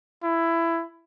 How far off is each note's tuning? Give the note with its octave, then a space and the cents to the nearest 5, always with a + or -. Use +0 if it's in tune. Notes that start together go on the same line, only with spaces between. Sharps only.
E4 +15